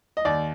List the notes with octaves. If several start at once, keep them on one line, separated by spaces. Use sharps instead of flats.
D#5
D#2 D5